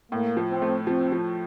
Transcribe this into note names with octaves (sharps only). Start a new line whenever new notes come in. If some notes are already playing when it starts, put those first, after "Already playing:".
A2 A#3
F3
C4
A3
F3 C4
F3